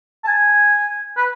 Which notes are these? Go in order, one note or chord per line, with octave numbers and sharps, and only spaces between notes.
A5
G#5
B4